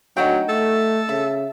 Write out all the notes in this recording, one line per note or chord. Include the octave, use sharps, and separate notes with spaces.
D2 F#3 D#4 F#4 G5
A3 A4
C#3 E5